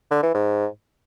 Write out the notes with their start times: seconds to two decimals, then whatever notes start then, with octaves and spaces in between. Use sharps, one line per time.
0.11 D3
0.23 E3
0.35 G#2